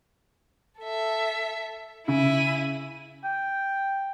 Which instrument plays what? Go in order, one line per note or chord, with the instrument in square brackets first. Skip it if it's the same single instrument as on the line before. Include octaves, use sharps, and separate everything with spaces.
[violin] A4 E5
[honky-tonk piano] C#3 [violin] E4 D#7
[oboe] G5